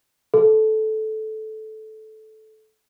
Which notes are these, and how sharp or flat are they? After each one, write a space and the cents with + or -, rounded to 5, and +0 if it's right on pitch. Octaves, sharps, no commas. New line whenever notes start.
A4 -15